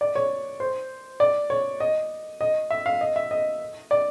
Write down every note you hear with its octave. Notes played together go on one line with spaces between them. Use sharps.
D5
C#5
C5
D5
C#5
D#5
D#5
E5
F5
D#5
E5
D#5
D5